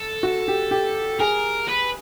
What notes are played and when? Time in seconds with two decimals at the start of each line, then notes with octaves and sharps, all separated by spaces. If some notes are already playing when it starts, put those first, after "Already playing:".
Already playing: A4
0.23 F#4
0.48 G4
0.71 G4
1.20 G#4 A#4
1.68 B4